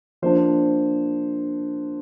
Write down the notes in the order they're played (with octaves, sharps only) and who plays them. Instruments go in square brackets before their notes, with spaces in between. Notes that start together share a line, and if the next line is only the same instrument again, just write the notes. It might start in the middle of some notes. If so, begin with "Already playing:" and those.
[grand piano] F3 A#3 D4 F4 C5